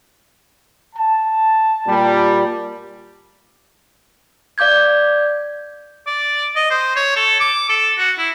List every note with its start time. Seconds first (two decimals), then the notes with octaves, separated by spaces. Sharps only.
0.96 A5
1.86 A#2 G3
4.58 D5 F5 D6 G6 G#6
6.07 D5
6.56 D#5
6.70 C5
6.96 C#5
7.16 A4
7.40 D6
7.69 A4
7.98 F#4
8.18 E4